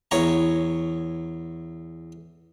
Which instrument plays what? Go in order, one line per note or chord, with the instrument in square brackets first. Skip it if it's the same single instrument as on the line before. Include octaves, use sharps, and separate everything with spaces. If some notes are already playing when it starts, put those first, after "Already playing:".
[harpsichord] E2 C#5 A#5